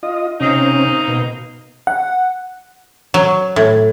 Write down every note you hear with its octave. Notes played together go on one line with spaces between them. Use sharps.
F4 D#5
C3 A#3 C4 C#4 D#4
B2
F#5
F#3
A2